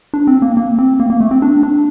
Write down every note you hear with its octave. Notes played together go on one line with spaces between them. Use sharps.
D4
C4
A#3
A#3
C4
A#3
A#3
A3
C4
D4
D4